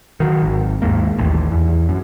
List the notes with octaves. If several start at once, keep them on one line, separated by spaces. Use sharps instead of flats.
D#3 F#3
G#1
D#2 G#2 A#3
A1 D#2
E2
F#2